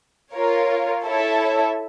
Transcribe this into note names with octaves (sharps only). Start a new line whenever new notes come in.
F4 A#4 C#5
E4 A4 C#5 E5